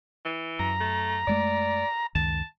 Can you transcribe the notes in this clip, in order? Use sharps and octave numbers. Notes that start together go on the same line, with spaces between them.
E3
F#2 A#5
A3
F#2 G#3 A3 D5
C#2 F#2 D#3 A5